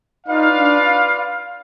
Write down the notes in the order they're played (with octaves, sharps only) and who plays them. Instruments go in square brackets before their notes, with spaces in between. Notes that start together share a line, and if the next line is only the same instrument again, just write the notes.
[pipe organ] D#4 [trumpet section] F4 B4 D5 F5
[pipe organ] D4